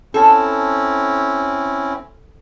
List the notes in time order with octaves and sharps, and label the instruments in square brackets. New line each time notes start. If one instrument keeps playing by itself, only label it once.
[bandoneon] C4 C#4 E4 [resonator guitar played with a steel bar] A4